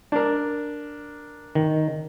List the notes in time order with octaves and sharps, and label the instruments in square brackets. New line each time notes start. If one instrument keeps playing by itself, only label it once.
[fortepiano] D4 A#4
[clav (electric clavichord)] D#3